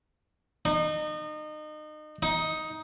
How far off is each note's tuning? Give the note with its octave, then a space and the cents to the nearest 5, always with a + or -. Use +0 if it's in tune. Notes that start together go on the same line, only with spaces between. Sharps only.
D#4 -30
D#4 +10